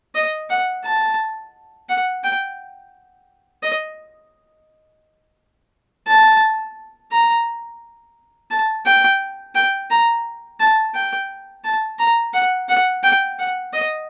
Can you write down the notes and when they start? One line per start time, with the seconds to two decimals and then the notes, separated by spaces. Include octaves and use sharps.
0.15 D#5
0.50 F#5
0.85 A5
1.89 F#5
2.24 G5
3.63 D#5
6.08 A5
7.12 A#5
8.51 A5
8.86 G5
9.55 G5
9.90 A#5
10.60 A5
10.94 G5
11.64 A5
11.99 A#5
12.34 F#5
12.69 F#5
13.03 G5
13.39 F#5
13.73 D#5